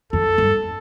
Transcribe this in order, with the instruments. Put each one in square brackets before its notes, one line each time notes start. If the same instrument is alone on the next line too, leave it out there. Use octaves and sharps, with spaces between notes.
[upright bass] F2 [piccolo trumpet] A4
[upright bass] G2